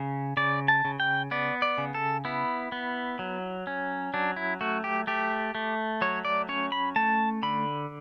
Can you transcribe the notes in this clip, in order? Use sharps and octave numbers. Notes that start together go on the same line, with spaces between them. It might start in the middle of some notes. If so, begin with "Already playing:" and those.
Already playing: C#3
C#3 D5
A5
C#3
G5
B3 D5
D5
C#3
A4
B3 E4
B3
F#3
C#4
F#3 D4
E4
A3 F#4
G4
A3 G4
A3
F#3 C#5
D5
C#4 C#5
B5
A3 A5
D3 B5